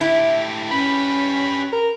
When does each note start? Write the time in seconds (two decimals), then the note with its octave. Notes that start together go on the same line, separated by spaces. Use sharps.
0.01 A2 E4 G4
0.71 C#4 G4 B4 B5
1.73 A#4